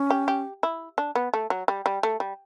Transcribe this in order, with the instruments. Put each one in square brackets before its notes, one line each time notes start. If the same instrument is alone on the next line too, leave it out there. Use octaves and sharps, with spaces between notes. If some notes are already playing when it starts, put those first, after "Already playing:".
Already playing: [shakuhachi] C#4
[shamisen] G4
G4
E4
D4
B3
A3
F#3
G3
G3
A3
G3